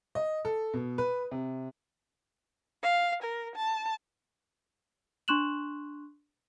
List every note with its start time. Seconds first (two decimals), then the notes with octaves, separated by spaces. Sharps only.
0.15 D#5
0.45 A4
0.74 B2
0.98 B4
1.31 C3
2.83 F5
3.23 A#4
3.56 A5
5.28 D4 C6 C#6 F#6 E7 F#7